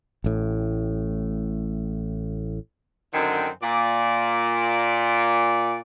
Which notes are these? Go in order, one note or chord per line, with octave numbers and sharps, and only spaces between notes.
A1 A2
F#2 D3 D#3 C4
A#2 D5